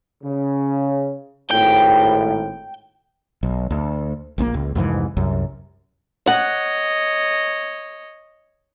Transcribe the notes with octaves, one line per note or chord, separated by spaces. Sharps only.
C#3
G#1 A2 G5
B1
D2
A#1 A#2 D3 A#3
C#2
C2 F2 G#2 E3
C2 F#2
C#5 D#5 F#5